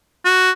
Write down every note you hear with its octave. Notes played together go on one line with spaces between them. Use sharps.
F#4